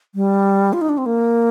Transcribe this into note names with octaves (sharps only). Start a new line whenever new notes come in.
G3
F4
D#4
D4
C4
A#3